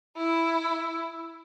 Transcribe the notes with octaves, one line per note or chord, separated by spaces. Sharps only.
E4